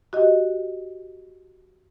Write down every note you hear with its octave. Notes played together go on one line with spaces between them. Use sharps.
F#4 G4 D#5